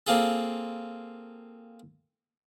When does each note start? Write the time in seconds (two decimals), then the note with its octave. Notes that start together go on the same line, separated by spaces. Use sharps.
0.07 A#3 C4 F4 G#4 A4